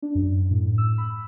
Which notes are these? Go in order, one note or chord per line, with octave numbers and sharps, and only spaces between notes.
D4
F#2
A2
E6
B5